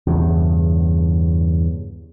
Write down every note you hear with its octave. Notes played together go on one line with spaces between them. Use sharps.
E2 G2 C#3